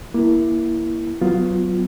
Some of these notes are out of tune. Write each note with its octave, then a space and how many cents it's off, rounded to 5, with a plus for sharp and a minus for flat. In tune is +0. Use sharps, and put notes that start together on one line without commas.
A#3 +15 E4 +0
F#3 +5 B3 +15 F4 +0